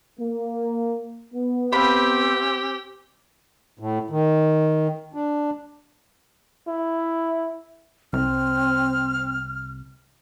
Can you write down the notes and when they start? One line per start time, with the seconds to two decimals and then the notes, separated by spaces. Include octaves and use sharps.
0.20 A#3
1.35 B3
1.73 C4 G4 F5 B5
3.79 A2
4.10 D#3
5.14 D4
6.68 E4
8.13 C2 C4 F6